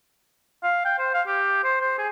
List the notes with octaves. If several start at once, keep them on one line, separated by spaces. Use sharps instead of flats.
F5
G5
C5
F5
G4
C5
C5
G#4